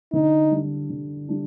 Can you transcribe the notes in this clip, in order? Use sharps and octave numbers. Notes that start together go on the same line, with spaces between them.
D3 D#4
G3 D4
D3
G3 D4